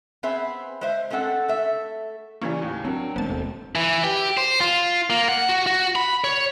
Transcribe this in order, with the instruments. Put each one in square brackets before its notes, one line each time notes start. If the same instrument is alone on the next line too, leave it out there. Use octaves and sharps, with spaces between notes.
[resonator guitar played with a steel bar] B3 C4 G#4 C5 E5
G#3 C5 E5
G#3 A3 C4 A4 F#5
A3 E5
[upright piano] C#3 E3 G3 [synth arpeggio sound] A#3 C#4 [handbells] G#5 C#6
[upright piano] D#2 A2
[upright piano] F#3 [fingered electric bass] C4 [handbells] D4 A#4
[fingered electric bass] E1 G#3 A3 [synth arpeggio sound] B3 A5 [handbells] C4 C5
[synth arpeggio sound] D#2 [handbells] A4
[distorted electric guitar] E3
G4
C5
F4
A#3
F#5
F#4
F#4
B5
C#5